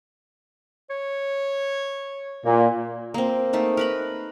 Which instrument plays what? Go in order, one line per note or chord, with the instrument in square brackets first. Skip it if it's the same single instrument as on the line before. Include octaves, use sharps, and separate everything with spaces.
[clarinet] C#5
[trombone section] A#2 [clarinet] A#3
[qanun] A#3 C4
A3 A#3 D#4
A#4 B4 B5